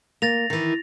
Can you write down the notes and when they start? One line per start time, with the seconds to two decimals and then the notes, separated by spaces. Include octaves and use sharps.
0.22 A#3 A6 A#6 F7
0.50 D#3 E3